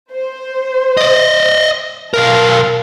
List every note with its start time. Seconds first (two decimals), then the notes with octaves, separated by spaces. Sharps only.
0.12 C5
0.97 D5 D#5
2.14 B1 A#4 F5 A5